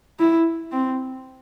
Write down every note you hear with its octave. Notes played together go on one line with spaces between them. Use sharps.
E4
C4